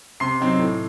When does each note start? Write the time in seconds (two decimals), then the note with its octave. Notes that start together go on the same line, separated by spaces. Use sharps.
0.20 C3 C6 C7
0.40 F#3 C4 D#4
0.59 A2